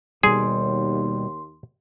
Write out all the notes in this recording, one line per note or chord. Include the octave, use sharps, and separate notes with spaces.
D#2 B2 G3 G#4 C6